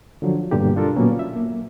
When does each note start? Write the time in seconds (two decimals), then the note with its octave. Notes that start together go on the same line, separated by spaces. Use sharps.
0.22 D3 F3 F#3
0.51 G2 B2 D3 A#3 G4
0.76 D4 F4 A4 A#4
0.96 A#2 F#3 A#3 B3 C#4
1.19 E5
1.36 A#3